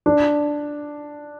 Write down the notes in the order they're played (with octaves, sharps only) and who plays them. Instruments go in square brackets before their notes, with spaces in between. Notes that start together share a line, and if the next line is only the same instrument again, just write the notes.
[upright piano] D4